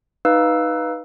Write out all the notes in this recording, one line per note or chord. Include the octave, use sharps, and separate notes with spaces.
D#4 B4 F5 E6